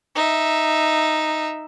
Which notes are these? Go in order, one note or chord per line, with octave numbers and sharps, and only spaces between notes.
D#4 E5